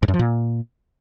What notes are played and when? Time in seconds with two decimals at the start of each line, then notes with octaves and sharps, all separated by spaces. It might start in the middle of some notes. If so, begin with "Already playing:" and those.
0.03 G#2
0.08 F#2
0.14 F3
0.19 A#2